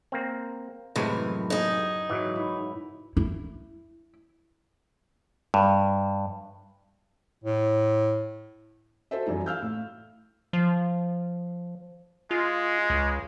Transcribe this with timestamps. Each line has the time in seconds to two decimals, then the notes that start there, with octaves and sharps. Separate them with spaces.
0.12 A#3 C4
0.96 F#1 A2 C3 E3 G#3 A#4
1.50 D#4 G#4
2.10 G#2 E3 F#3
2.35 E4
3.17 E4
5.54 G2
7.44 A2
9.11 F#4 A4 C5 E5
9.26 F#2 E3 G3 D#4
9.46 F5 E6 F6 G6
9.62 A2
10.53 F3
12.31 G#3 F4
12.90 C#2